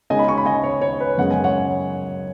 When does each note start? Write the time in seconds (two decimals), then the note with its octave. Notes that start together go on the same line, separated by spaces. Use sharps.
0.10 C#3 G#3 D#4 D#5 G#5
0.19 B5
0.28 G#5 C#6
0.38 B5
0.46 D#5 G#5
0.64 C#5
0.81 C#5
1.00 B4
1.18 F#2 C#3 G#3 F#5
1.31 G#5
1.44 C#5 F#5